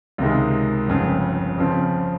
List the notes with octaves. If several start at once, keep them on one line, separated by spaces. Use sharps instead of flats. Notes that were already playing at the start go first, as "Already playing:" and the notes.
C#2 C3 D#3 G#3
G1 F2 C#3
F2 C#3 F3 C4